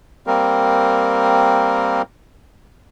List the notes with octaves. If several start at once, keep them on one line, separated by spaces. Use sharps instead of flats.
G3 A#3 C4 A#4